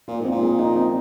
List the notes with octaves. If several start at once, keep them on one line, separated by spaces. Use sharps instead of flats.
A#2 F4
G#2 C4
A#2
G#4
D#4
C4